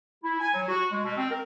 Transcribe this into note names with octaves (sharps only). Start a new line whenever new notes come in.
E4
G#5
F#3
F#4
G#3
B2
C4
A#4